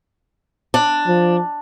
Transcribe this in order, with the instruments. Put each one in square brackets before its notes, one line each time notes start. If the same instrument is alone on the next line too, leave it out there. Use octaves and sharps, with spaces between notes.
[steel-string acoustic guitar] D4
[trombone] F3